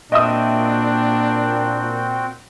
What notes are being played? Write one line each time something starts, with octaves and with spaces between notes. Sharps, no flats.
A#2 C4 D4 F#4 D#5 E5 G5 D#6